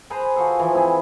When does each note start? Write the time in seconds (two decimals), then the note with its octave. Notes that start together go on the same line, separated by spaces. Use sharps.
0.10 G#4 B4 C5 A#5
0.36 F4 F#4 G#4 A4
0.59 E3 F3
0.75 C4 E4 G#4 B4